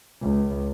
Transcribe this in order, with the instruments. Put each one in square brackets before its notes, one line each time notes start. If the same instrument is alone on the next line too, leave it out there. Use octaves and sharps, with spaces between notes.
[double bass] C#2